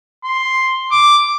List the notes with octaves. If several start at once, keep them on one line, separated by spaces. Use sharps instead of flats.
C6
D6